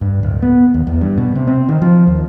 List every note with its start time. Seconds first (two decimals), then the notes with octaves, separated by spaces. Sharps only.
0.01 G2
0.23 D1
0.42 B3
0.74 D#2
0.87 E2
1.01 G2
1.18 B2
1.35 C3
1.47 C4
1.69 D#3
1.82 F3
2.07 D#2